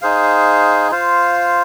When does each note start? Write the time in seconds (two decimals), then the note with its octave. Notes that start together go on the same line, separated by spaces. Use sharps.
0.02 D#4 G#4 C5 F5
0.91 F4 C5 F5